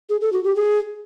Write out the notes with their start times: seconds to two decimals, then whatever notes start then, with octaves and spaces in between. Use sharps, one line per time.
0.10 G#4
0.21 A4
0.33 F#4
0.44 G4
0.56 G#4